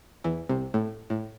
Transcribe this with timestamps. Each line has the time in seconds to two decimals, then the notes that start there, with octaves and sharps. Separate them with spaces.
0.24 E2 E3
0.49 C2 C3
0.74 A2
1.10 A2